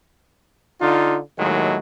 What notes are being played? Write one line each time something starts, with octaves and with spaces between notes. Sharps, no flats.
D3 D#4 F4
D#2 A2 D#3 F#3 G#3